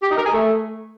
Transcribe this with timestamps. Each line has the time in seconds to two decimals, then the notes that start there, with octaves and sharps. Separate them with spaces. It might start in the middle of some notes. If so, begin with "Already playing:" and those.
0.02 G4
0.10 D#4
0.17 A#4
0.25 G#4
0.32 A3